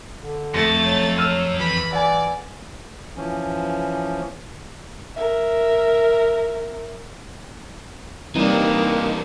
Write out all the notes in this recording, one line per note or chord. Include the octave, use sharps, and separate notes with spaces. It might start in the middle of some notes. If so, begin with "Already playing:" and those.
D3
F2 A3 A6 A#6 C#7
F#3
F#3 E6 F6 D#7
E3 B5
D5 F#5 G#5
E3 F3 C#4
A#4 E5
E3 G3 A#3 C4 D4 D#4